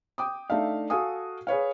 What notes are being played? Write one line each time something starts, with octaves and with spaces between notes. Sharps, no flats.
G5 D6 D#6
A3 D4 D#4 E5 F5
F#4 A4 F5 G#5 D#6
G#4 B4 C#5 F5